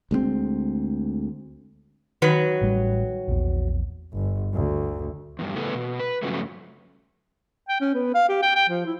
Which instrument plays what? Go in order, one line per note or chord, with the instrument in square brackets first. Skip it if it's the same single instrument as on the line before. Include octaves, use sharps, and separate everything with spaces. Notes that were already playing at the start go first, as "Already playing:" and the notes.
[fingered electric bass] D2 G#3 A3 C4
[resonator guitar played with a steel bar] D#3 F#3 B4
[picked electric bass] A1 G3
A#1 E2
[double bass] G1
D2
[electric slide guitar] E2 G2
C#3 E3 A3 B3 A4
B2
B4
G2 C#3 F3 F#3 A3
[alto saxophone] G5
C#4
B3
F5
G4
G5
G5
F3
E4